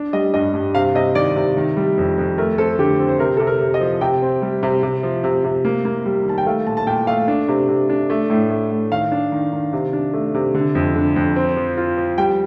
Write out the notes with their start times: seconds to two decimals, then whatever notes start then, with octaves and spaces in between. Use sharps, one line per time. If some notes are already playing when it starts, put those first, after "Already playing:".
Already playing: D4
0.13 G3 D#5
0.34 G2 D#5
0.54 G2
0.75 C3 F5
0.95 C3 D#5
1.15 D#3 D5
1.36 C3
1.57 D#3
1.77 G3
1.98 F2
2.18 F2
2.38 A3 A#4
2.58 C4 A4
2.79 D3 G4
2.99 C4
3.09 C5
3.19 C3 A#4
3.37 C3 A4
3.47 A#4
3.61 C3
3.74 D#5
3.80 F3
4.01 C3 G5
4.22 C4
4.42 G3
4.63 C3
4.83 C3
5.03 F3
5.24 C3
5.44 C3
5.65 A#3
5.85 A#3
6.06 G3
6.25 D#3 A5
6.38 G5
6.46 A3 F5
6.67 A#2 A5
6.77 A5
6.87 A#2 G5
7.07 A3 F5
7.28 D4
7.48 C3
7.69 C3
7.89 D4
8.10 A3
8.30 A2
8.50 A3
8.71 A2
8.91 D#3 F5
9.12 D4
9.32 D#3
9.53 D#3
9.73 C3
9.93 D4
10.14 A3
10.34 C3
10.55 D3
10.75 F2
10.96 D3
11.16 F2
11.36 C4
11.57 F3
11.77 F4
11.97 F3
12.18 G3 G5